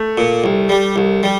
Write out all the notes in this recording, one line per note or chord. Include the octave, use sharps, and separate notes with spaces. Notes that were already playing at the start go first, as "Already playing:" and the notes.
Already playing: A3
A#2
C2
G3
C2
G3